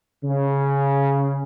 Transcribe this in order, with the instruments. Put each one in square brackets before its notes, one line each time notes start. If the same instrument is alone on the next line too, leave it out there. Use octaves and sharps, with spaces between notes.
[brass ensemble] C#3